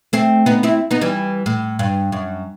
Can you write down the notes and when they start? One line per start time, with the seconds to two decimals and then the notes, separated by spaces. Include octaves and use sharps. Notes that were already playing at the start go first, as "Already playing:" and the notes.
0.13 A3 C4
0.46 B3 D#4
0.63 C4 E4
0.91 B3 D#4
1.01 E3 G3
1.46 A2
1.79 G2
2.12 F#2